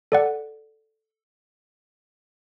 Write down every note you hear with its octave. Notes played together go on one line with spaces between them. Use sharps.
A4 D5 F#5